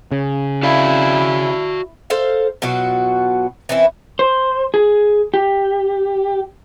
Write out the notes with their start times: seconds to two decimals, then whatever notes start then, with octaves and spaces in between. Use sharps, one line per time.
0.11 C#3
0.63 E4 F#4 D5 F5
2.10 A4 C5 F5
2.62 B2 F#3 F4 F#4
3.69 E3 C4 C#4 E4
4.19 C5
4.74 G#4
5.34 G4